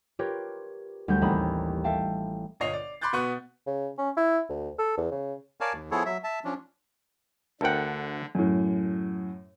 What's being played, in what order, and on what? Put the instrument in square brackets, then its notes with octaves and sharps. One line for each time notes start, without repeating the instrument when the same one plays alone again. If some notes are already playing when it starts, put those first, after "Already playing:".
[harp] F4 G4 A#4 B4 C#5
D2 G3 G6
A1 D#2 C4 A#5 B5 D#6
A4 E5 F5 G5 A5
[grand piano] G1 A#2 C#5 D#5 C7 F7
D5
B5 C6 D6 F#6 G6 A6
B2 B3 C#6 F#6
[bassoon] C#3
C#4
E4
D2
A4
E2
C#3
[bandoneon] A#4 C#5 D5 F5 G#5 A5
D#2
F3 B3 E4 G#4 A4 C#5
F#3 E5
E5 A5
F3 C#4 D4
[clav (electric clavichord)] D2 F#5 [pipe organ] D3 [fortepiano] A4 A#4 G5
[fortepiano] F#2 A2